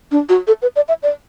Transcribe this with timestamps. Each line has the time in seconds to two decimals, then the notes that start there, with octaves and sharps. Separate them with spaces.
0.11 D4
0.29 F#4
0.47 A4
0.62 B4
0.76 D5
0.88 E5
1.03 D5